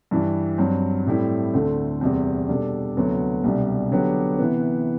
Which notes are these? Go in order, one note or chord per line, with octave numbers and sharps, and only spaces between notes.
G2 E3 G3
G2 F#3 C4
A2 G3 C4 E4
D2 D3 A3 C4
E2 C3 G3 C4
B2 G3 D4 A4
D2 C3 F#3 B3
C2 B2 G3 D4
D3 F#3 B3 D4 G4
C3 E3 B3